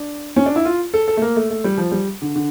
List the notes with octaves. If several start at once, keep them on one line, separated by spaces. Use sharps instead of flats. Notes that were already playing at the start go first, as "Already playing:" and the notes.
Already playing: D4
C#4
D4
E4
F4
A4
A4
A3
A#3
A3
A3
G3
F3
G3
D3
D3